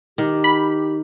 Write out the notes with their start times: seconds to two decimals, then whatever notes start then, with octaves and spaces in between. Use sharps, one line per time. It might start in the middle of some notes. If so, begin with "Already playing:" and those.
0.18 D#3 G4
0.44 B5